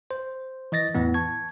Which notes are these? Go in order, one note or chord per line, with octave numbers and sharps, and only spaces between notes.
C5
E3 D#5 A6 A#6
E2 A2 E3 B3
A5 C#6 G#6